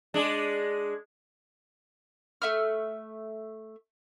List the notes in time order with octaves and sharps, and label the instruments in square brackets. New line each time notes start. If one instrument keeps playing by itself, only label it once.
[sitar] G#3 D4
[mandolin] A3 E5 E6 F6